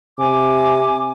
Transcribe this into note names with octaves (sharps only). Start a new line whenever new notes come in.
C3 G#5 D6